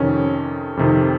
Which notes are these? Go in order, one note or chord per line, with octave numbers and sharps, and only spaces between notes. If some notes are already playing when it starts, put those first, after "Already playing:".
Already playing: F2 C3 D#3 C#4
F2 C3 D#3